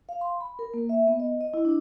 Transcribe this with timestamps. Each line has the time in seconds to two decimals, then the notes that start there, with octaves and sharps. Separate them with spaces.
0.09 F5
0.21 C6
0.41 B5
0.59 A#4
0.74 A#3
0.89 E5
1.07 B3
1.20 D#5
1.41 D#5
1.54 E4
1.65 D4